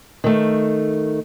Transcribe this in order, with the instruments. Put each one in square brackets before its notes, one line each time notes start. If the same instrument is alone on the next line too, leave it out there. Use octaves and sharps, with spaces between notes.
[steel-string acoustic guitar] D#3 A3